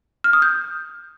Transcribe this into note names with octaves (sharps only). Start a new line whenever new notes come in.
F6
D#6
G6